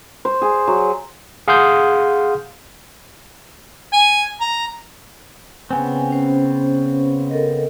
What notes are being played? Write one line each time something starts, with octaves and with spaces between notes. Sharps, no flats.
C5
G#4
F#3
G#4 F5 F#5 C6 D#6 G6
G#5
A#5
C#3 B3 C4 G#5
C#4 C5
A4 A#4 D#5